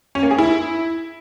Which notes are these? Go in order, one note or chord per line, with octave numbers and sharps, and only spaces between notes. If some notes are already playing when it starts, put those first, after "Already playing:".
C#4
A#3
G#4
E4